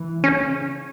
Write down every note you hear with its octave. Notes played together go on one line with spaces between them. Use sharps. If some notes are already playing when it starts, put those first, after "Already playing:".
Already playing: E3
C#3 C#4